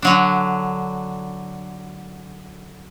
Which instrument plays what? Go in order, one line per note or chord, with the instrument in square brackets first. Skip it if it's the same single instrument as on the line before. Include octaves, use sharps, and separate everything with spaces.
[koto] D3 F#3 D4